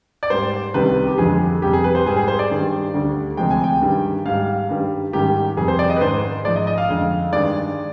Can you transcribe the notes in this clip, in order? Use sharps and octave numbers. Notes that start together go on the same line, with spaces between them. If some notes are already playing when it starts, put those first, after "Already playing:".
D5
G#2 G3 C5
C2 C3 D#3 G3 B4
G4
F2 D3 F3 G#3 G#4
F2 C3 G3 G4
G#4
B4
C5
G#2 G3 G#4
G#4
C5
D5
G2 D#3 G3
D2 D3 G3
D2 C3 F3 G#3 G5
G#5
G5
G2 D#3 G3
G#2 G3 F5
G2 D#3 G3
G#2 D#3 G3 G4
F2 C3 G3 G#4
C5
D5
D#5
B4
G#2 D#3 G#3 C5
G#2 F3 G#3 D5
D#5
D#5
F5
F2 D3 G#3
G2 D#3 G#3 D5